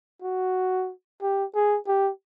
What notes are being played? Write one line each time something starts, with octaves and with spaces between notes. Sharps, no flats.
F#4
G4
G#4
G4